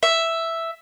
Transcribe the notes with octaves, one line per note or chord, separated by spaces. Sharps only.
E5